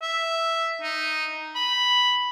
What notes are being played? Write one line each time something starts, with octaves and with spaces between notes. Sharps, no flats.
E5
D#4
B5